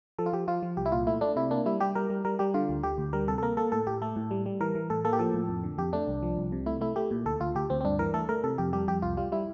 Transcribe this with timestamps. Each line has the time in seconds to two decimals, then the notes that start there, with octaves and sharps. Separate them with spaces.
0.19 F3 A4
0.26 F4
0.33 F3 G4
0.48 F3 F4
0.63 F3
0.77 C2 G4
0.86 E4
0.92 A#2 F4
1.07 A3 E4
1.21 A3 D4
1.36 C3 E4
1.51 A#3 D4
1.66 G3 E4
1.80 G3 G4
1.95 G3 A#4
2.10 G3
2.25 G3 A#4
2.39 G3 G4
2.54 D3 F4
2.69 D2
2.83 D3 G4
2.98 D2
3.13 G3 A#4
3.28 C3 A4
3.38 A4
3.42 A#3 A#4
3.57 A#3 A4
3.72 A2 A4
3.87 A2 G4
4.02 A3 A4
4.16 A2
4.31 G3
4.46 G3
4.61 E3 A#4
4.75 E3
4.90 A2 A4
5.05 A#3 A4
5.13 G4
5.19 F3 A4
5.34 A2
5.49 F2
5.64 D3
5.78 F2 G4
5.93 A3 D4
6.08 C2
6.23 F3
6.37 C2
6.52 C3
6.66 A3 E4
6.81 A3 E4
6.96 A3 G4
7.11 A#2
7.25 D2 A4
7.40 D2 F4
7.55 D2 G4
7.70 D2 C4
7.81 C4
7.84 G2 D4
7.99 E3 A#4
8.14 A3 A4
8.29 A3 A#4
8.44 C3 A4
8.58 F2 G4
8.73 G3 G4
8.88 F2 G4
9.02 C2 F4
9.17 G3 F4
9.32 G3 E4